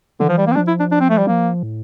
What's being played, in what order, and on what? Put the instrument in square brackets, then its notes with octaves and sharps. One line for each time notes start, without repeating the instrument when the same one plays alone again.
[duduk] D3 [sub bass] E3
[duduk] F3
G3
A#3
C4
[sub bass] F3 [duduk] D4
[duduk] E4
D4
D4
C4
A3
G3
[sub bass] F3 [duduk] A#3
[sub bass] A2